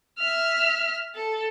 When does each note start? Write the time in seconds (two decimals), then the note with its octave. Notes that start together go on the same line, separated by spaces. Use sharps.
0.18 E5 F6
1.15 A4